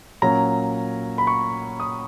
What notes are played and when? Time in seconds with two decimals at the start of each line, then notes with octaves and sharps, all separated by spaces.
0.22 A#2 F#3 C#4 A#5
1.18 B5
1.27 C#6
1.80 D#6